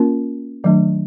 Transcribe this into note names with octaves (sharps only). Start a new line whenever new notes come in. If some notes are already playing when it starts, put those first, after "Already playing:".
Already playing: A#3 C#4 F4 A#4
D#3 F#3 A3 D4